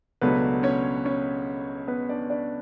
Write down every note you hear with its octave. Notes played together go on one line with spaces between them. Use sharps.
C#2 B2 F#3 A3 B3 D4 B4
C#4 C#5
C#4 C#5
B3 B4
D4 D5
D4 D5